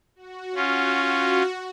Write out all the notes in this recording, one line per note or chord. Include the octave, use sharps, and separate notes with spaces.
F#4
C#4 F4